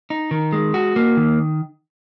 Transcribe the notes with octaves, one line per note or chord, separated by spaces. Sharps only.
D#4
D#3
G#3
F#4
A#3
D#3